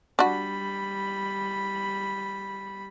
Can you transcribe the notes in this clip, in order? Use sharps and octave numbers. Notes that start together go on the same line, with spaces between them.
G3 D4 F#4 B5